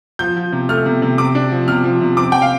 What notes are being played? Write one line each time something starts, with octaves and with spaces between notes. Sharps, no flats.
F3 G6
F3
C3
A3 F6
C3
C3
C3 D6
D4
F3
C3 F6
F3
C3
C4 D6
G5
F5